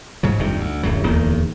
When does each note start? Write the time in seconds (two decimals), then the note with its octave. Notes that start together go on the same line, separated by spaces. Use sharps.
0.23 G#2 C#3 F#3
0.38 F1 G2 C3 D#3
0.58 D2
0.83 D1 F#2 F#3
1.03 D1 E2 D#3 A#3